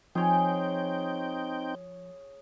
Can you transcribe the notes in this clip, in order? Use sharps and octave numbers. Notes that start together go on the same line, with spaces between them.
F3 C4 D#4 G#4 C#5 G5 G#5